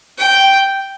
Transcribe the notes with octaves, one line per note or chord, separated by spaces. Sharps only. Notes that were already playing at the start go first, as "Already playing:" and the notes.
G5